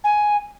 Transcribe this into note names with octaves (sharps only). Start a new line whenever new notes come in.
G#5